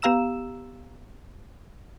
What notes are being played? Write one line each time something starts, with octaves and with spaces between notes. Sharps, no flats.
B3 G4 F5 A#5 E6 E7